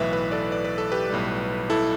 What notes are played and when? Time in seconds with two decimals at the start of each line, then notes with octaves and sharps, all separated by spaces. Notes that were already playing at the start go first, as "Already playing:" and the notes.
Already playing: B1 A2 E3 B4 E5
0.13 B4 E5
0.31 A4 D5
0.52 D5
0.65 B4
0.78 A4
0.92 G4 B4
1.10 B1 A2 G3
1.70 E4 A4